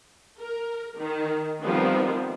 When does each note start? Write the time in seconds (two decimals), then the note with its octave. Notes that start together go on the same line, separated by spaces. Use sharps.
0.39 A#4
0.97 D#3
1.62 D#3 F3 G3 A3 B3 C4